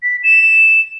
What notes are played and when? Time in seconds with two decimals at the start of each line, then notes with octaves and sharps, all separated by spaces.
0.03 B6
0.24 E7